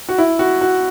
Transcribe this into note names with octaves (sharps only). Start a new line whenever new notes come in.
F#4
E4
F#4
F#4